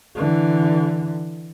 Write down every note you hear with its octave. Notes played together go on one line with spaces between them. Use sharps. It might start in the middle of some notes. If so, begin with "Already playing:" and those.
D3 E3